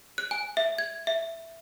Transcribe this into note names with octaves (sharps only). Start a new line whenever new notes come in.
F#6
G#5
E5
G#6
E5